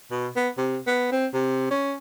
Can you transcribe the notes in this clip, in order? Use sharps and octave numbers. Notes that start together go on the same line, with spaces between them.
B2
B3
C3
B3
C4
C3
C#4